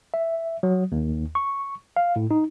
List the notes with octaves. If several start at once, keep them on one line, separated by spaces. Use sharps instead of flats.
E5
F#3
D#2
C#6
F5
A2
D#4